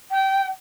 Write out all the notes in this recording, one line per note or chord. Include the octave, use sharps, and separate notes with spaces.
G5